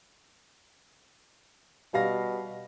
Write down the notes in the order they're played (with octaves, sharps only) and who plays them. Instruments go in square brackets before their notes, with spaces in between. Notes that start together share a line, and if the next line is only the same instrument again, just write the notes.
[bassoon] B2 [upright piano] G3 F5 A#6